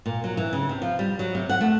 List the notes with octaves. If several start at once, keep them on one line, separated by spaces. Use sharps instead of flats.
A#2
F#3
E3
C#3
C3
F3
G3
F#3
C3
F#5
A3